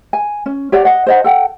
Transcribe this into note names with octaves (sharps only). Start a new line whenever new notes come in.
G#5
C#4
G4 C#5 D5 F#5
D#5 F#5
C5 D#5 F#5
A4 F#5 G5